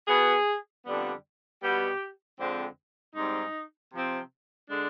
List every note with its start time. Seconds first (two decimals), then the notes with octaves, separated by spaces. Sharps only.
0.07 B2 B3 G#4
0.84 F2 D3 G3 B3
1.62 B2 G3 B3 G4
2.39 F2 D3 G#3 C4
3.16 G#2 G3 C4 D#4
3.93 C3 F3 C4
4.70 D3 G#3 D4